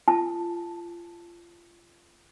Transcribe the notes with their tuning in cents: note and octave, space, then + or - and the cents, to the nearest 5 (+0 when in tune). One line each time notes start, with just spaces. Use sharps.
F4 -25 A5 +0